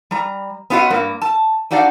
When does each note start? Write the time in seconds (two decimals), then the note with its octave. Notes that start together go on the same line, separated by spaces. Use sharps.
0.11 G3 A#5
0.70 B3 C#4 F4 F#4 D#5
0.90 G2 A#3
1.22 A5
1.71 D4 D#4 F#4 D5 F5